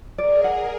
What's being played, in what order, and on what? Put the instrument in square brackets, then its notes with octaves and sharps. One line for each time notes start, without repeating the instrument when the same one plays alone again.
[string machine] G#4 A#4 [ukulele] D5
[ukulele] F#5